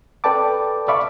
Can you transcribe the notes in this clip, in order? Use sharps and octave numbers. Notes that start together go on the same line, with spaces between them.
A4 B4 D5 G5 A5 D6
D5 E5 F5 B5 C#6 D6